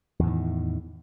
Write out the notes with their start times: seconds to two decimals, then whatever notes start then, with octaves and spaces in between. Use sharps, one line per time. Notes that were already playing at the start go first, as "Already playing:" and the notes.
0.19 E2
0.23 A2
0.27 D#3